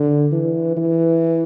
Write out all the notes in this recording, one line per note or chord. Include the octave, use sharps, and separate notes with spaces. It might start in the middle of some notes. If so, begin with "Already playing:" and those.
Already playing: D3
E3
E3